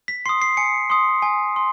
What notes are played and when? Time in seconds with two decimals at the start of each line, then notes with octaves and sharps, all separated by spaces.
0.08 B6
0.26 C6 D#6 C7
0.42 C7
0.57 G#5 C#7
0.90 C6 D#6
1.22 G#5
1.56 C6